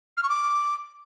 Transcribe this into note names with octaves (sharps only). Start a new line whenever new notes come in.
F6
C#6
D6